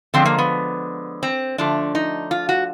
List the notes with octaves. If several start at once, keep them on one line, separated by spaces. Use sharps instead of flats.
D3 F3 G#3 C4
A#3
B3
C4
D3 F3 A3 D4
D#4
F4
F#4